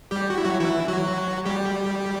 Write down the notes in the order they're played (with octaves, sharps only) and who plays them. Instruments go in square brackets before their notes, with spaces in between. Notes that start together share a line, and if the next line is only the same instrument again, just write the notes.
[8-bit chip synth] G3 G4
F#4
E4
F#3 F#4
E3 E4
F#3 F#4
G3 G4